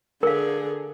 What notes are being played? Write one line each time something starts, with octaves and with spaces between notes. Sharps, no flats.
D3 G#4 A#4 F5